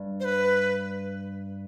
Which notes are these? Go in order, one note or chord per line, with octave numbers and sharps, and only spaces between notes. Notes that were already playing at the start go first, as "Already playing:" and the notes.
Already playing: G2
C5
B4